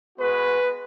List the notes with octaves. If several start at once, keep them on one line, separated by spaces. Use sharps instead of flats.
G#3 B3 F#4 B4